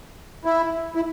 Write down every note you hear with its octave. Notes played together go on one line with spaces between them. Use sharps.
E4
E4